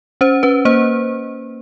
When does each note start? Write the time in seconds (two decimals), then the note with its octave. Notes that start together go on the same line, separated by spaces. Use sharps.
0.21 C#4 C5
0.43 C#4 B4
0.65 A#3 C5